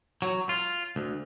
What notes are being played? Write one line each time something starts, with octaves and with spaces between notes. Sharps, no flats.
F#3
F4
D2